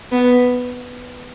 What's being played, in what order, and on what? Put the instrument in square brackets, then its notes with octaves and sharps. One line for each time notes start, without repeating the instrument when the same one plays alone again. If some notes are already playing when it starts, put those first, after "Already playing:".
[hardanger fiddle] B3